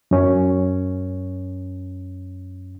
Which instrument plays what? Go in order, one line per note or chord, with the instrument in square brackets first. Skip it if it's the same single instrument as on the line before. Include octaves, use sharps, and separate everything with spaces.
[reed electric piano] F#2 C#4